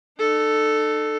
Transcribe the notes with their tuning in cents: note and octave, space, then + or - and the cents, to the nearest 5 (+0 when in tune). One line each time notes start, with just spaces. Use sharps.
D#4 -45 A4 +0